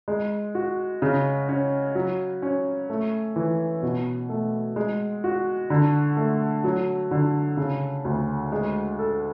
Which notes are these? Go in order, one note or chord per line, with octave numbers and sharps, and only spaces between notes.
G#3
F#4
C#3
C#4
F#3
C#4
A3
E3
B2
A3
G#3
F#4
D3
A3
F#3
D3
C#3
D2
G#3
A4